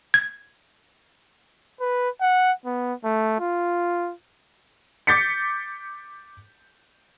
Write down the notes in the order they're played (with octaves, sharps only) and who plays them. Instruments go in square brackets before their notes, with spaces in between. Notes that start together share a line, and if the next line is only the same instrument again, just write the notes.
[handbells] G#6
[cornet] B4
F#5
B3
A3
F4
[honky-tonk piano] D6 G6 A6 B6 C#7